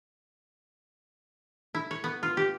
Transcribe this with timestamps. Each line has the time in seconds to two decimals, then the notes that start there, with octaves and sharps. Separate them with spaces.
1.75 E4
1.91 C#5
2.04 B3
2.23 F4
2.37 G4